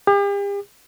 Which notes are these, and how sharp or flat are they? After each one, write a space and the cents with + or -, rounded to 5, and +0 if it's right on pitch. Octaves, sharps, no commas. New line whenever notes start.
G4 +45